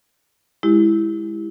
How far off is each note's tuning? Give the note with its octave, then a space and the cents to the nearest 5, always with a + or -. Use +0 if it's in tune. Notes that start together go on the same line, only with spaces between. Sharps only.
G#3 +0 E4 +0 G4 +0